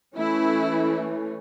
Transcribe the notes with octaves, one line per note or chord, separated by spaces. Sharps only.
E3 A3 C#4 E4